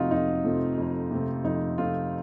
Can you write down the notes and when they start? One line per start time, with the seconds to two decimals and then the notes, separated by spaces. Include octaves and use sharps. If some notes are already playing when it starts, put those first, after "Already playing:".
Already playing: F2 C3 F3 A3 C4 D#4 F4 F#4
0.11 F2 D#4
0.44 C3 F3 A3 C4
0.78 F2
1.11 C3 F3 A3 C4
1.44 F2 D#4
1.78 C3 F3 A3 C4 F4